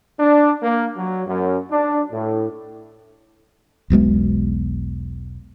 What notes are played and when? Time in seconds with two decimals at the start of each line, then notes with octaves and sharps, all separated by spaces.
0.18 D4
0.63 A#3
0.97 F#3
1.27 F#2
1.71 D4
2.11 A2
3.90 E1 B1 B2 G#3